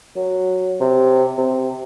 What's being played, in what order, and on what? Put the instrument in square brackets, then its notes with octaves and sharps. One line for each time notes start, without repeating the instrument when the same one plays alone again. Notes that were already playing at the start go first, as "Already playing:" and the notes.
[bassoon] F#3
C3
C3